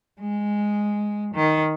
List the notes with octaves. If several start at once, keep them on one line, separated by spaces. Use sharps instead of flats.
G#3
D#3